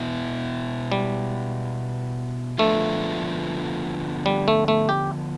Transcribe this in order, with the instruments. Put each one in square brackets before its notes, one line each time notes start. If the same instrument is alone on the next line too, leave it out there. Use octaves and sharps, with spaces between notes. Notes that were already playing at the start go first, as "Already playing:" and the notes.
Already playing: [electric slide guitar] B2 B3 E4
[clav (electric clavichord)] G3
[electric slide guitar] D3 F3 B3 D4 F4 [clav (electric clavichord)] A3
[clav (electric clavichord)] G3
A3
A3
G4